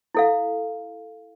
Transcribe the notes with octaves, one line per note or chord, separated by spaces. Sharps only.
E4 A4 F5